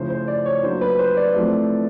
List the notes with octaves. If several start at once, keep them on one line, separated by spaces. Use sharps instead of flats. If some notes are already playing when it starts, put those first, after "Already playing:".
Already playing: C#3 F3 A3 C#4 E4 C5
C5
D5
C#5
F#3 A#3 D4 F4 C5
B4
C5
D5
F3 A3 C4 E4